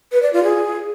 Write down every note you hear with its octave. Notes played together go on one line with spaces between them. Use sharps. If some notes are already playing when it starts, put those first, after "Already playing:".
B4
D5
F4
G#4